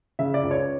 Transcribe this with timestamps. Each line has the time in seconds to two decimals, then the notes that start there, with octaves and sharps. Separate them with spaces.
0.19 C#3 E5
0.34 D5
0.43 C#2
0.51 C#5